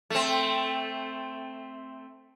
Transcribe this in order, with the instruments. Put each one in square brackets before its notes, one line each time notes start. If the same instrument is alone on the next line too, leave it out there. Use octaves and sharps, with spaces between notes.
[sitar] A3 C4